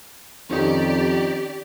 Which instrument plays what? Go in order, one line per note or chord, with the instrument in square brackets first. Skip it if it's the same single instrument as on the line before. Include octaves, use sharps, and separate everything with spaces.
[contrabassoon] F2 [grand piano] D#3 C#4 D#4 [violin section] G4 D5